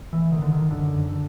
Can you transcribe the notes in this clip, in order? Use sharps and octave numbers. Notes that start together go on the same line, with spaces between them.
E3
D3 D#3
D3
D#3
F#2 D3
D3